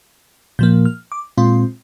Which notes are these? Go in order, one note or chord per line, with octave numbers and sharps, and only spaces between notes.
A#2 F3 A#3 G6
F6
D6
A#2 G#3 C4 F4 C6